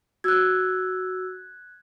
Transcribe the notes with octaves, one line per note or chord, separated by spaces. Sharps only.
F#4 E6 F#6 G#6